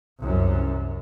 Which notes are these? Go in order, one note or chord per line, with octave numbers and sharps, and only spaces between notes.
C2 F#2